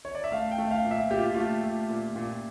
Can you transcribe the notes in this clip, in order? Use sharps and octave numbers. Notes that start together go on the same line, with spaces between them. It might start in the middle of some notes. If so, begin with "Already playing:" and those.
C#5
D5
E5
A3 F5
G5
A3
F5
A#2
E5
A#2 G4
F4
A3 F4
A3
A#2
A#2